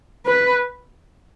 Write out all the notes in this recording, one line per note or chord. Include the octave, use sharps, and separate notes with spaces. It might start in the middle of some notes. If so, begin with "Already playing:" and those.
B4